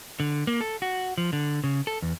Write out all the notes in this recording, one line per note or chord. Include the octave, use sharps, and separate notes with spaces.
D3
A#3
A4
F#4
F3
D3
C#3
A4
E2